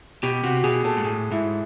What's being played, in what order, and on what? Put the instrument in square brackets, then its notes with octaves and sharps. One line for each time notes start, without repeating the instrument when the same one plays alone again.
[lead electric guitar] B2 [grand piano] G4
[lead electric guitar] C3 [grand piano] F#4
[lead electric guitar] B2 [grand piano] G#4
[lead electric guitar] A#2 [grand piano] A4
[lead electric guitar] G#2
[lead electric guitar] A2 [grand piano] G#4
[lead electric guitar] G#2 [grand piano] E4